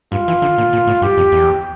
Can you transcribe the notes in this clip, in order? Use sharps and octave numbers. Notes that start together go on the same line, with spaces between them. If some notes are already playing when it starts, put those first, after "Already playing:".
G2 F4
E3
D3
A#2
A#2
A2
G2 G4
F2
E2